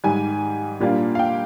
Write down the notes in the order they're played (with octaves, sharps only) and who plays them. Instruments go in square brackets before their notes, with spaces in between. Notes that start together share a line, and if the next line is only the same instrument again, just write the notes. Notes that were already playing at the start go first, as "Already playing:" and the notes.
[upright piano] G#2 D#3 G3 G#5
A#2 G3 A#3 D4 F4
F5
G5